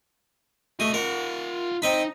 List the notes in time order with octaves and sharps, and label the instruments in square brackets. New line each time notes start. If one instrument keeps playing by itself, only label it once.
[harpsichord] A3 D#6 [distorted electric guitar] F#4 D#5
[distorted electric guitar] F4 F#5 [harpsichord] A#4
[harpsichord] C4 D#5 B5 [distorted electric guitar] D#4